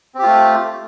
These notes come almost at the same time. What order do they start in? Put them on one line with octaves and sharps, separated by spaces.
C4 G4 F4 A3